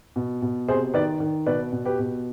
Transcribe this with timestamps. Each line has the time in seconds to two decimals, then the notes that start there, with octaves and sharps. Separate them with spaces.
0.16 B2
0.42 B2
0.68 C3 G#4 C5
0.94 D#3 B4 D5
1.20 D#3
1.46 B2 B4 D5
1.72 B2
1.85 G4 B4
1.99 B2